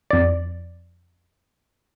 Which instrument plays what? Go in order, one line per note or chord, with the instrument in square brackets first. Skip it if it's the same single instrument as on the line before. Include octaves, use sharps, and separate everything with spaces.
[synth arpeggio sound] F2 D5